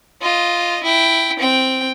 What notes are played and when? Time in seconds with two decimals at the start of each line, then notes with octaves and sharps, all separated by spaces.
0.22 F4 D#5
0.83 E4 G5
1.40 C4 G5